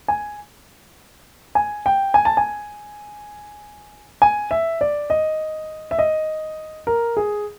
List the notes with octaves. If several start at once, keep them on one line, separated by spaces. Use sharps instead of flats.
G#5
G#5
G5
G#5
A5
G#5
G#5
E5
D5
D#5
E5
D#5
A#4
G#4